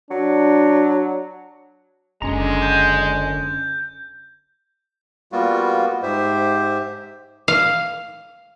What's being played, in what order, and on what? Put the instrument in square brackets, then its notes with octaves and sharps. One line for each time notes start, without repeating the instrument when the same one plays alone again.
[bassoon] F#3 [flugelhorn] D4
[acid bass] F#1 [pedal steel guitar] D3 C#4 A#5 [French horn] G#3
[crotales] G6
[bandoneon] G3 A#3 B3 F4 F#4
G#2 G4 C5 E5
[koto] F5